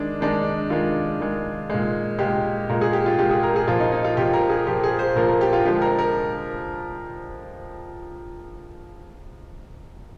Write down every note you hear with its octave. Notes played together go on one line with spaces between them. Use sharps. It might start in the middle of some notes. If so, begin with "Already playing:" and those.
Already playing: D#3 G#3 D4
D#3 G#3 D4
D#3 G#3 F4
D#3 G#3
A#2 G#3
A#2 G#3 G4
A#2 G#3 A#4
G#4
G4
F4
A#2 G#3 G4
G#4
A#4
G#4
A#2 F3 A#3 F4
D#4
D#4
F4
A#2 F3 A#3 G4
A#4
G#4
A#2 F3 A#3 G4
G#4
C5
A#2 F3 A#3 A#4
A#4
G4
F4
D3 F3 G#3 G4
A#4
A#4